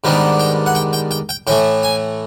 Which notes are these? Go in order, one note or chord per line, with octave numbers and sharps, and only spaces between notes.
G#2 D#3 G3 B3 D4
G5
F#5
G5
G5
G5
G5
A2 E3 A3 G5
G#5